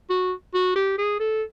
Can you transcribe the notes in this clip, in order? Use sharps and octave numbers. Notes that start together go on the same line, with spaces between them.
F#4
F#4
G4
G#4
A4